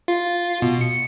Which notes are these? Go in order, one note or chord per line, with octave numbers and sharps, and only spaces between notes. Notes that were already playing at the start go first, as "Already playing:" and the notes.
F4
B2
C#7